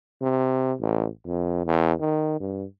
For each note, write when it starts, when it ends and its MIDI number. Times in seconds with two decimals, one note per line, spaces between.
0.22 0.73 48
0.80 1.08 33
1.26 1.65 41
1.66 1.93 40
1.99 2.39 51
2.40 2.65 43